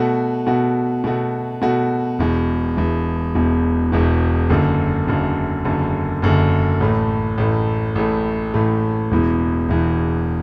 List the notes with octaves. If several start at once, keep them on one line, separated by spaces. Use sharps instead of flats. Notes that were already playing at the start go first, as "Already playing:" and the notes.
Already playing: B2 A3 F#4
B2 A3 F#4
B2 A3 F#4
B2 A3 F#4
E1 E2 B2
E1 E2 B2
E1 E2 B2
E1 E2 B2
F#1 F#2 D3
F#1 F#2 D3
F#1 F#2 D3
F#1 F#2 D3
A1 A2 A3
A1 A2 A3
A1 A2 A3
A1 A2 A3
E1 E2 E3
E1 E2 E3